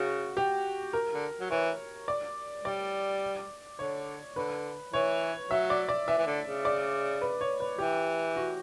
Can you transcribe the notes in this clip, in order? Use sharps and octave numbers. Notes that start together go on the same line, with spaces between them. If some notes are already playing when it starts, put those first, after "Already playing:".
Already playing: C#3 F#4
G4
A#4
D3
F#3
E3 C#5
D5
G3 D5
D3 C#5
D3 B4
E3 C#5
F#3 E5
D5
D5
E3 E5
E3
D3
C#3
D5
B4
C#5
B4
E3 G4
F#4